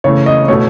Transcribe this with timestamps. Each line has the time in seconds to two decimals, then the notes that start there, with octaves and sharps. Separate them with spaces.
0.04 C#3 E3 A3 C#5
0.26 D#5
0.48 B2 A3 C#5